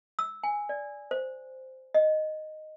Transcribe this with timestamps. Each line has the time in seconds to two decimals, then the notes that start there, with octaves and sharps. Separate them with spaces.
0.19 E6
0.43 G#5
0.69 D5
1.11 C5
1.94 D#5